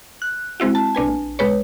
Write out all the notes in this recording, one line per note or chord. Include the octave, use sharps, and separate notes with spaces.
F#6
G#3 C4 E4 F#4
A5
B1 D4 B4 G#5
A#1
B1 G#3 B4 C#5